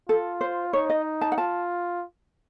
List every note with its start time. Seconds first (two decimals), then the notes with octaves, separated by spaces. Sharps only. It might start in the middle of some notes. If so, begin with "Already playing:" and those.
0.09 F4 A4
0.41 C5
0.73 D#4 C#5
0.90 D#5
1.21 A5
1.32 F#5
1.38 F4 A5